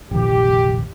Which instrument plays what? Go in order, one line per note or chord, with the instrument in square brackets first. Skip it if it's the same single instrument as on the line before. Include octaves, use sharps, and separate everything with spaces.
[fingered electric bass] F1 A#1 D#3 [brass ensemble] G4